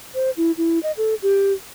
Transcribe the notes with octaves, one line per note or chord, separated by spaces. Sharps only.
C5
E4
E4
D#5
A4
G4